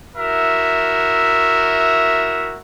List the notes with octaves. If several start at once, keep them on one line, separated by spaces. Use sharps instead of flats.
E4 F#4 A#4 E5